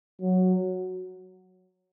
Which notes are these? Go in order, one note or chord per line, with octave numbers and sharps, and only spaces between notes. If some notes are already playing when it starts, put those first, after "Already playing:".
F#3